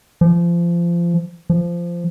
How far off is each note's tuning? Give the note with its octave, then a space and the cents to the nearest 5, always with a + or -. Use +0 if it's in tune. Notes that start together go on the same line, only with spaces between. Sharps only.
F3 -25
F3 -15